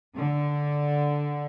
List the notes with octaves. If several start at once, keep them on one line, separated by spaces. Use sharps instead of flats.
D3